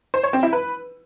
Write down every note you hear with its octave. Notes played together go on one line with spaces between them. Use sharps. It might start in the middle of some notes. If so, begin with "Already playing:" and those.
C5
C#5
C4
E4
B4